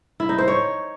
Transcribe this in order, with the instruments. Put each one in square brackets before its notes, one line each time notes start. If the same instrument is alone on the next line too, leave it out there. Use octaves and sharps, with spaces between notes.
[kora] E4
D#4
C5
C#5